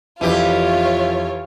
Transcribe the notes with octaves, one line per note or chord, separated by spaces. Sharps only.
F2 E3 F4 G4 C#5